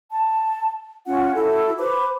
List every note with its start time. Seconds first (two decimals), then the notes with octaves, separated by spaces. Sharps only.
0.11 A5
1.06 C#4 F4 F#5
1.34 E4 F#4 A4
1.78 B4 C5 B5 D6